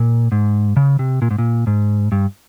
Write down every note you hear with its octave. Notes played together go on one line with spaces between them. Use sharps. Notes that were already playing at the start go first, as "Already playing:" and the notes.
Already playing: A#2
G#2
C#3
C3
A#2
G#2
A#2
G#2
G2